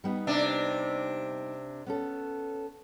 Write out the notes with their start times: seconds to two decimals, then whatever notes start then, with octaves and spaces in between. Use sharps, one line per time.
0.04 G3 B3 D#4
0.27 C3 D4
1.86 B3 C#4 A4